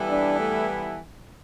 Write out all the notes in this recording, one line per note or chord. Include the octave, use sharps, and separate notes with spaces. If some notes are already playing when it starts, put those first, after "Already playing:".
Already playing: E3 G3 B3 E4 A4
D4
A3